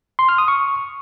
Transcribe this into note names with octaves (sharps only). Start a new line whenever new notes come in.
C6
F6
D#6
C#6